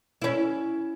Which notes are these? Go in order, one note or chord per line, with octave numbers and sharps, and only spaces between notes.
C#4 E4